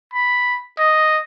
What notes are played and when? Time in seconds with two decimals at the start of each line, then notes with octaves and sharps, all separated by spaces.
0.14 B5
0.79 D#5